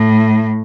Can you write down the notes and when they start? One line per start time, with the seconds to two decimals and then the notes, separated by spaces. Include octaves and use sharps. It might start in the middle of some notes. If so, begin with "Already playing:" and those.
Already playing: A2